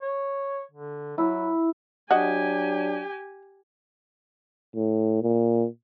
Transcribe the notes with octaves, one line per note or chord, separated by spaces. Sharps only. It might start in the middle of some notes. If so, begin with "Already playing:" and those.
C#5
D3
F#3 E4
F#3 D4 F#4 G4 D#5 G#5
A2
A#2